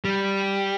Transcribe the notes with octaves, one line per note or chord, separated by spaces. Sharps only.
G3